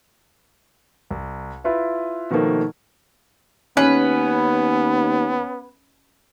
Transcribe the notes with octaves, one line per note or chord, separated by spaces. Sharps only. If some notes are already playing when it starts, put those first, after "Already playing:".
C2
E4 F4 B4 E5
B2 D#3 F3 A3 A#3
D#2 B3 C#4 B4